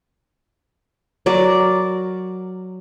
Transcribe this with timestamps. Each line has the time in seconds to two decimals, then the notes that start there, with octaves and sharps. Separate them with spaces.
1.26 F#3 A#4 D5